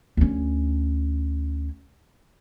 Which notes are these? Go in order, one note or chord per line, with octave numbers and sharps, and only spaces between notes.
D2 C#4